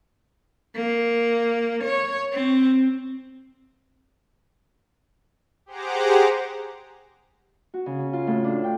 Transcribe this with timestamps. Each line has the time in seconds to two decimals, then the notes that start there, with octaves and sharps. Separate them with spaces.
0.76 A#3
1.84 C#5
2.32 C4
5.66 G4 G#4 C5 F#5 A#5 D6
7.74 F#4
7.86 C#3
7.99 C#4
8.13 F4
8.27 A2
8.44 D4
8.64 G5